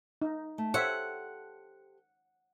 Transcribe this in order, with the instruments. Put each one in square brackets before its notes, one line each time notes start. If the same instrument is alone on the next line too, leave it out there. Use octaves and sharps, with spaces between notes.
[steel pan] D#4
[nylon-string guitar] A3
[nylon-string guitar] G4 A4 C5 [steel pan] C#5 E5 [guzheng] F#5